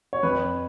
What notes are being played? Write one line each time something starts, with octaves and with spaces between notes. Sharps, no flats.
C#5
F2 B4